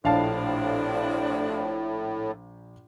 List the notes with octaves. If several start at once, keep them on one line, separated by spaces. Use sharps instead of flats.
A#1 A2 C3 F3 D4 F5 A5